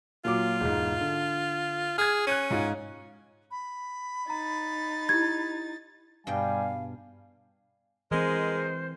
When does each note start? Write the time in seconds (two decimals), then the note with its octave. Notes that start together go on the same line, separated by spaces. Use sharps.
0.25 A#2 F#3 F4 D6
0.60 E1 G#2
1.01 D3
1.98 G#4 F6 G#6
2.27 C#4 F#6 G#6 D#7
2.50 G#2 F4
3.51 B5
4.30 D#4 A#5 A6
5.09 E4 G4 G#6
6.27 G2 B2 G3 F5 G5 G#5
8.11 E3 G#3 C4 A#4 C5 D#5